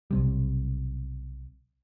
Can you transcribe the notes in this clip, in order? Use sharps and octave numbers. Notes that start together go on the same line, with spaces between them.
B1 C3 G3